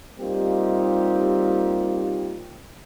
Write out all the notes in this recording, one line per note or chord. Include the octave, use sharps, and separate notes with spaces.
G3 A#3 C4 D#4 F4 G4